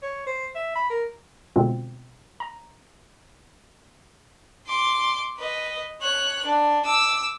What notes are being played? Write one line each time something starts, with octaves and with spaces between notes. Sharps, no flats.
C#5
C5
E5
B5
A#4
B2 D3 G#3 C4 F4
A#5
C6 D6
B4 D#5
C#5 F#6
D4
D6 E6